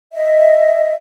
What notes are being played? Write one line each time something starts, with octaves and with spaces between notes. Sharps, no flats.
D#5 E5